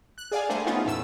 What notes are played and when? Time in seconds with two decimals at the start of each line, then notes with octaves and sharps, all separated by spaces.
0.18 F#6
0.31 G#4 D5 F5 G#5
0.49 D3 G3 A3 A#3 G#4 C5
0.66 A3 B3 C#4 D#4 F4 G#4
0.85 E2 A2 E6